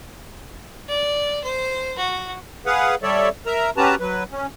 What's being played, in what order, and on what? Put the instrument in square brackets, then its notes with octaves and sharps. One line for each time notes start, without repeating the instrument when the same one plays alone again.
[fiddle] D5
C5
F#4
[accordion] G#4 B4 F5 F#5
G3 A4 C#5 D5 E5
A#4 E5 A#5
C#4 F#4 G4 B4 A5 A#5
F#3 B4
C#4